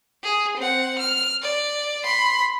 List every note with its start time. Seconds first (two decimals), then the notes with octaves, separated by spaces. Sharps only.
0.24 G#4
0.57 C4 F#5
0.99 F6
1.42 D5
2.03 B5 C6